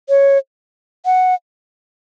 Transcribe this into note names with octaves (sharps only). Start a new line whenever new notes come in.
C#5
F#5